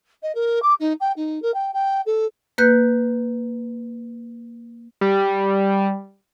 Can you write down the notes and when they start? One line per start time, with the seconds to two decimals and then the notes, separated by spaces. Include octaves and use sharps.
0.22 D#5
0.35 A#4
0.62 D6
0.80 D#4
1.00 G5
1.16 D#4
1.42 A#4
1.54 G5
1.73 G5
2.06 A4
2.58 A#3 B4 F#6 G6
5.01 G3